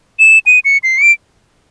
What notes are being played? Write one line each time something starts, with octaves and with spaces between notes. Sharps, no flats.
E7
D#7
C#7
C7
C#7
D7